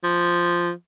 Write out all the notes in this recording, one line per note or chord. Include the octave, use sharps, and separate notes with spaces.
F3